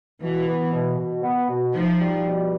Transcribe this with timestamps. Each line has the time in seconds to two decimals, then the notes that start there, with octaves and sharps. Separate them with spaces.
0.22 B2 E3
0.47 B3
0.73 B2
0.98 B2
1.24 B3
1.49 B2
1.74 F3 D#4
2.00 G3
2.25 B2